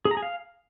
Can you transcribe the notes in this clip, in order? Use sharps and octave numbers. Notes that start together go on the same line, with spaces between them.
G#4
A#5
G#4
F5